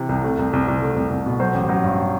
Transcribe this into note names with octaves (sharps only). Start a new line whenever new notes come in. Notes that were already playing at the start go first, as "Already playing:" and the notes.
Already playing: C3 E3
C2
A3
C2
C2
C2
A3
C2
C2
B2
F#3 C5
A1
F#3
G2